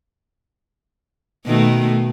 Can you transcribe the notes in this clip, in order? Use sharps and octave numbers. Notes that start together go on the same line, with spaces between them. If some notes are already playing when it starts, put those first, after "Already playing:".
B2 D#3 A3